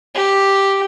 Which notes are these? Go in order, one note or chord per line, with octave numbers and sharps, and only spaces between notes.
G4